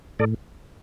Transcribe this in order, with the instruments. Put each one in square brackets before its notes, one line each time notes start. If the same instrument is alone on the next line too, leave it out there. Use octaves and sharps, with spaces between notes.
[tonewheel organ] A2 A4 D5